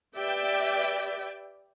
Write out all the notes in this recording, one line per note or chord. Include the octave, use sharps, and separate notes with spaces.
G4 B4 D5 E5 G5